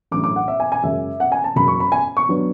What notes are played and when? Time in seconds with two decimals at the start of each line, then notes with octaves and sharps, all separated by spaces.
0.11 A1 A2 F#3 A3 D4 D6
0.24 D6
0.36 F#5
0.48 E5
0.60 G#5
0.72 G#5
0.83 F#2 C#3 G#3 C#4 E5
1.20 F#5
1.32 G#5
1.44 A5
1.56 F#1 F#2 C#3 F#3 B5
1.68 C#6
1.80 B5
1.92 G#5
2.17 C#6
2.29 F#3 B3 D4